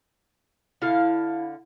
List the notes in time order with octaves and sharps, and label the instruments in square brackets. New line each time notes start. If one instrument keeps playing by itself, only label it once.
[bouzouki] D3 F5 [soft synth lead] E4